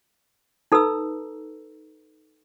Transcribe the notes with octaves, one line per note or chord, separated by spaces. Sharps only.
D#4 A4 B4 A#5 E6